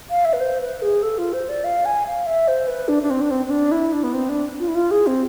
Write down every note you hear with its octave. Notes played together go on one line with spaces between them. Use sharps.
F5
E5
B4
C5
B4
G#4
A4
F4
C5
D5
F5
G#5
F5
E5
C5
B4
D4
D4
C4
D4
C4
C4
D4
E4
D4
B3
C4
D4
F4
E4
F4
G#4
C4